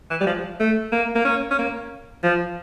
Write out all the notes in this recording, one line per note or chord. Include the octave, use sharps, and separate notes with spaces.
E3
G3
F3
A3
A#3
A#3
C#4
C#4
A#3
F3